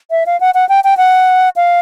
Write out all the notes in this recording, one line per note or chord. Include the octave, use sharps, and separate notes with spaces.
E5
F5
F#5
F#5
G5
G5
F#5
F5